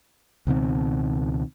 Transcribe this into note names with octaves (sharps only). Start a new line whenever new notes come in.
C#2 B2 D#3 C4